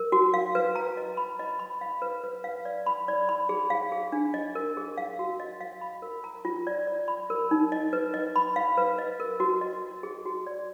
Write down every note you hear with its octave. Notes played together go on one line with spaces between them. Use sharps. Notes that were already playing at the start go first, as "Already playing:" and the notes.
Already playing: A#4
F#4
F5
B4
A#5
D#5
B5
D#5
B5
F5
B4
B4
F5
D5
B5
D5
B5
G#4
F5
G#4
D4
D#5
A#4
G#4
F5
F#4
D#5
F5
B5
A#4
A#5
F4
D5
D5
B5
A#4
D#4
D#5
B4
D#5
B5
F5
B4
D#5
A#4
F#4
D#5
D#5
G#4
F#4
D5